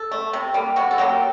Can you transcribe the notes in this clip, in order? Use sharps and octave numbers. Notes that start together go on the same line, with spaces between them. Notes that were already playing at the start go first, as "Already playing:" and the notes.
Already playing: A4
A3
C3
G3 A#3
C3 F#4
A4
F#3 A#3 G4